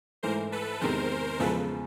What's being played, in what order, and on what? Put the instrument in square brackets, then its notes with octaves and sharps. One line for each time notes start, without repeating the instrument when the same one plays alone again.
[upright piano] G#2 E3 A3 [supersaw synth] A#4 C5
[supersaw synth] A4 B4
[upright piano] E2 C3 D#3 G#3 [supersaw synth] A#4 C5
[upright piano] E2 C#3 F3 G#3 [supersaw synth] A4 B4